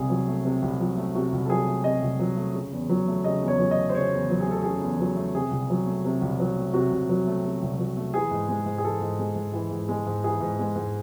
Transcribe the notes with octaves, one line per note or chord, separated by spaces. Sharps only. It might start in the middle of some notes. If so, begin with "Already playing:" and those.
Already playing: C2 C3 G#4
F#3
A3
C3
C2
F#3
A3
C3 F#4
C2
A4
F#3 G#4
A3
C3 D#5
C2
F#3
A3
C#3
E2
F#3
A3
C#3 D#5
E2
C#5
F#3
D#5
A3
C5
C#3 C#5
E2
F#3
G#4
A3 A4
C#3 G#4
E2
F#3
A3
C3 G#4
C2
F#3
A3
C3
C2
F#3
A3
C3 F#4
C2
F#3
A3
C3
C2
F#3
A3
E3 G#4
G#2
G#3
G#2
G#4
E3 A4
G#2
G#3
G#2
E3
G#2
G#3
G#2
E3 G#4
G#2
G#3
G#2